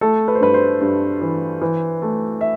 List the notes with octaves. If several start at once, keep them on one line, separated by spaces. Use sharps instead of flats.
A3 A4
B4
C5
G2 B4
C5
G2
E3
E3
A3
E5